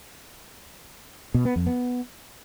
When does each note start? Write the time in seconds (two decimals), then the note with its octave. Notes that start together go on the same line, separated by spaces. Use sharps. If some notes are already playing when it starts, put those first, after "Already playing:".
1.34 B2
1.45 B3
1.56 F2
1.67 B3